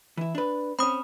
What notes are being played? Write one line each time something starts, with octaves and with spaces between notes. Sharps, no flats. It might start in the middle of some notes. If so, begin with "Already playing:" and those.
E3 E4
D4 B4
C4 C#4 B5 D#6